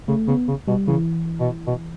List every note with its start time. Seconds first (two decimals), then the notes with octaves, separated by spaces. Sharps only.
0.08 C#3 A3
0.28 C#3 B3
0.48 C#3
0.67 B2 G3
0.88 C#3 E3
1.40 B2
1.67 B2